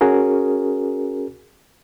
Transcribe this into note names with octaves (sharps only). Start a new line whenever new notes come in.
C#4 F#4 G#4 A#4